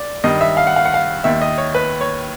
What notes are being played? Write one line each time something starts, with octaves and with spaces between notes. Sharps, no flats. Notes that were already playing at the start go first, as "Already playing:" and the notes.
Already playing: D5
G2 D#3 D#5
E5
F5
F#5
F5
F#5
F5
D#2 D#3 E5
D#5
C#5
B4
C#5